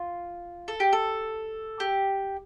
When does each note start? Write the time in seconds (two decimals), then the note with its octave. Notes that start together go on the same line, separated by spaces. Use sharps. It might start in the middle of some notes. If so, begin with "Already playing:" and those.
Already playing: F4
0.68 A4
0.80 G4
0.93 A4
1.80 G4